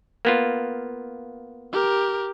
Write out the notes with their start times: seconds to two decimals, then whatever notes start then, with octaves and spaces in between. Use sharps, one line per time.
0.25 A#3 B3 F4
1.73 G4 A#4